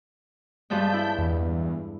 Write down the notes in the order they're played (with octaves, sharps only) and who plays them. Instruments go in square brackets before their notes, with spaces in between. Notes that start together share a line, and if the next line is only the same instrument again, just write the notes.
[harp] G2 F3 G#3 [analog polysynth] A5 G6 B6
[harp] E4
[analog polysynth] E2